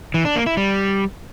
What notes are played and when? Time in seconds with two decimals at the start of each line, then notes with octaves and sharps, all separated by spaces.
0.14 E3
0.25 D4
0.36 A#3
0.46 E4
0.57 G3